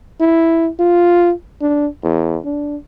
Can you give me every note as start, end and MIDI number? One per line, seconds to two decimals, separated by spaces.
0.20 0.70 64
0.79 1.32 65
1.61 1.87 62
2.03 2.38 40
2.45 2.77 62